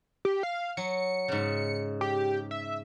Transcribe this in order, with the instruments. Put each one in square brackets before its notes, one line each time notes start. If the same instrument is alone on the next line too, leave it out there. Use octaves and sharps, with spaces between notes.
[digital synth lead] G4
F5
[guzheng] F#3 [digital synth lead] C#7
[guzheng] G#2 C#3
[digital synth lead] G4
E5